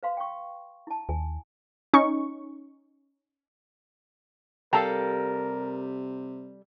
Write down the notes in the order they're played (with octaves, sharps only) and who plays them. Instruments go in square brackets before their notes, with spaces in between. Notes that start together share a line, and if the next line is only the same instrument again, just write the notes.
[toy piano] B4 F5 C6
G5 C#6
E4 A5
[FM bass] D#2 [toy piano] G#5
[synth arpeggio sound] C#4 D#4 C#6
[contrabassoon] C3 [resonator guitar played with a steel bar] G3 A4 F5 [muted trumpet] A#4 [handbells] G5 A5 A#5